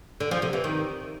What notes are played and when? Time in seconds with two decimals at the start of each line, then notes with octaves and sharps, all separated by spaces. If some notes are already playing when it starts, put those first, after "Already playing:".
0.20 D3
0.31 F3
0.42 C3
0.53 E3
0.64 D#3